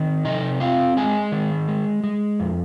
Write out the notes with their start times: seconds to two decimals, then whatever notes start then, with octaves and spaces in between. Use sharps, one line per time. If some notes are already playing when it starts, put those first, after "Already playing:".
Already playing: D#3 C4
0.25 C3 D#4 D#5
0.60 C4 F4 F5
0.97 G#3 G#4 G#5
1.32 D#3
1.68 G#3
2.04 G#3
2.40 F2